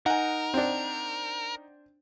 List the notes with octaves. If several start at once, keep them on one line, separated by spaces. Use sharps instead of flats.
D#4 A#4 F#5 G#5
C4 D4